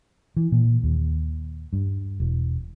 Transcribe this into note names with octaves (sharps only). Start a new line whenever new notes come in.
E3
A#2
D#2
G2
E1